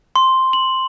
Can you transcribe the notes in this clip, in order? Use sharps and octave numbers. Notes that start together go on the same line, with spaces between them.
C6
F#7